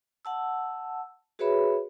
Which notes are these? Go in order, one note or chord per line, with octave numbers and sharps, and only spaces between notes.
F#5 A5 E6
F#4 G#4 B4 C#5 E5 B5